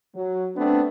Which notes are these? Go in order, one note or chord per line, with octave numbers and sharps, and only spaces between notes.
F#3
A3 B3 C4 D4